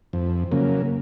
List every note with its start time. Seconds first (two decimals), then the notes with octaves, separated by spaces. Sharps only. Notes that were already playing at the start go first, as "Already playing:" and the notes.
0.13 F2
0.51 C#3 F#3 A#3